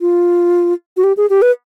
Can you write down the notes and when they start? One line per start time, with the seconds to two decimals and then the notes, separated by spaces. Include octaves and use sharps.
0.01 F4
0.97 F#4
1.04 G4
1.17 G#4
1.30 G4
1.42 B4